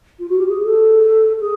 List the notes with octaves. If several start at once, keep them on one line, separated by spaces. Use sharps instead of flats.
F4
F#4
G4
G#4
A4
G#4